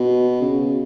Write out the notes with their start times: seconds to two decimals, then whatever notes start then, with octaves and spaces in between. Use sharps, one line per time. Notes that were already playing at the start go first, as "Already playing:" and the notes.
Already playing: B2
0.41 C#3